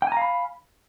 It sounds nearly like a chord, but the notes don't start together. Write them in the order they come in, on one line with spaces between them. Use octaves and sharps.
G5 G#5 A#5 F5 B5